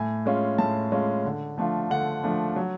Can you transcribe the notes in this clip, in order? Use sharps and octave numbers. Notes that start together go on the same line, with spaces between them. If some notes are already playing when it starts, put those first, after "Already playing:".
Already playing: A2 G#5
G#3 C#4 F4
A2 A5
G#3 C#4 F4
D3
F3 A3 D4 F4
D3 F#5
F3 A3 D4 F4
F#3